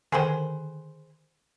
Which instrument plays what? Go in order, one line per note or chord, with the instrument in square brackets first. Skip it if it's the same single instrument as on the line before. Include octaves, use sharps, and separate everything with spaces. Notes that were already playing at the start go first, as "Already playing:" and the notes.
[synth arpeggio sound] D3 D#3 [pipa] G#4 B4 C5